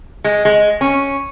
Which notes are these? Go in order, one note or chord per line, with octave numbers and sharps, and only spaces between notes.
G#3
G#3
C#4